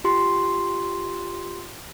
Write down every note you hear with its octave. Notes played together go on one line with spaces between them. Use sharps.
F4 G4 C6